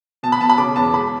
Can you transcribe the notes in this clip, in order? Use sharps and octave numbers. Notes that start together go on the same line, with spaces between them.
B2 A5
B5
B2 A5
B5
C#3 D6
E2 A5
G#3 B5